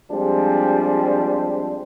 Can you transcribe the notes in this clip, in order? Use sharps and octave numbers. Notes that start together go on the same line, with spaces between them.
F3 G3 G#3 C4 D4